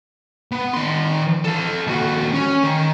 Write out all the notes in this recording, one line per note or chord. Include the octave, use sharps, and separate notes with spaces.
B3
D#3 C6
A4 F5
D#2 F#4
C#4
D#3